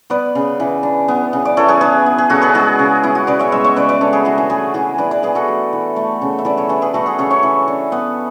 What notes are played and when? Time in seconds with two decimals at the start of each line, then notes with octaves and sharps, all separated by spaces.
0.10 B3 B4 D5
0.35 C#3
0.60 E3
0.83 D4
1.08 B3
1.33 C#3
1.45 D5
1.57 E3 A4 C#5
1.68 G#4 B4
1.81 D4 G#4 B4
2.06 B3
2.18 G#4 B4
2.30 C#3 F#4 A4
2.42 G#4 B4
2.54 G#3 E4 G#4
2.79 C#3
3.03 B3 E4
3.15 F#4
3.27 C#3 B4 D5
3.39 C#5 E5
3.52 G#3 C#5 E5
3.64 C#5 E5
3.76 C#3 B4 D5
3.89 B4 D5
4.01 D4 A4 C#5
4.13 G#4 B4
4.25 E3 F#4 A4
4.38 E4 G#4
4.50 A3 G#4 B4
4.74 E3 E4 G#4
4.98 D4 B4 D5
5.11 B4 D5
5.23 E3 G#4 B4
5.35 F#4 A4
5.48 A3
5.73 E3
5.96 A3
6.21 C#3
6.39 E5
6.45 E3 B4 D5
6.58 A4 C#5
6.69 D4 G#4 B4
6.82 G#4 B4
6.94 A3 F#4 A4
7.06 G#4 B4
7.18 C#3 A4 C#5
7.30 C#5 E5
7.43 E3
7.68 D4
7.92 B3